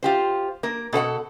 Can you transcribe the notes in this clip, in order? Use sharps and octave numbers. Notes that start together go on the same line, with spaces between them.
F4 G4 C5
A#3 A#4
B2 A4 C#5 F#5